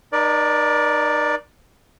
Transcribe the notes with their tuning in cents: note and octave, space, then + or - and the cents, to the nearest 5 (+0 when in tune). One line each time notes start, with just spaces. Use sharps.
D#4 -30 A#4 +45 D5 +0